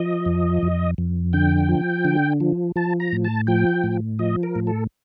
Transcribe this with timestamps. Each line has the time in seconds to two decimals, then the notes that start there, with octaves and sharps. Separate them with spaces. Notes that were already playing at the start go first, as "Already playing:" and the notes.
Already playing: F3 D#5
0.26 F2
0.62 F2
0.98 F2
1.33 D3 G5
1.69 F3
2.05 D3
2.40 F3
2.76 F3 A5
3.00 A#5
3.13 A2
3.24 A5
3.47 F3 G5
3.84 A2
4.19 F3 D#5
4.43 A#4
4.56 A2
4.67 A4